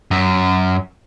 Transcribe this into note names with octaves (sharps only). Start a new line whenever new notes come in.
F#2